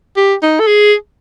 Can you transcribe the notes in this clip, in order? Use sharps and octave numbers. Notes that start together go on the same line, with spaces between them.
G4
D#4
A4
G#4